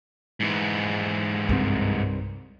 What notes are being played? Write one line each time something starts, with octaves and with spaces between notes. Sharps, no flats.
G#2 E3
C2 G2 C4